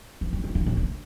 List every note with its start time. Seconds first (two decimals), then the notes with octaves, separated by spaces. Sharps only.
0.21 E3
0.33 G3
0.44 E3
0.55 D3
0.66 A2
0.77 D3